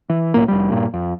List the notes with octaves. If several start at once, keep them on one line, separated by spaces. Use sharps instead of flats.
E3
B1 A2 A#3
F1 G3
G2 A#2
F2